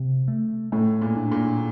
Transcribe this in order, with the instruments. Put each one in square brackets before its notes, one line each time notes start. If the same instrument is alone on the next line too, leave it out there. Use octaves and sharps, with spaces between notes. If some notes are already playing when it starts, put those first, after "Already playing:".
Already playing: [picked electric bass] C3
A3
[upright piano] A2 [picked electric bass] A3
[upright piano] A#2
[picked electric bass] D4
[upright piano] A#2